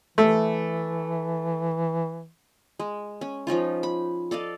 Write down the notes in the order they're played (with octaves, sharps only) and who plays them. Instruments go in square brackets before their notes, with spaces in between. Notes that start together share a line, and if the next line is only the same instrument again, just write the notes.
[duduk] E3 [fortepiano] A3
[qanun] G#3
C#4
F3 C#4 D#4 F4
B5
A4 D5 D#5 F5